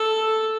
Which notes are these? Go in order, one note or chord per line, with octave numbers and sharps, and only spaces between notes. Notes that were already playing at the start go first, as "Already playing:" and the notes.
Already playing: A4